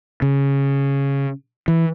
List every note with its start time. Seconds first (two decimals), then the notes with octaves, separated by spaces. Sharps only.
0.22 C#3
1.68 E3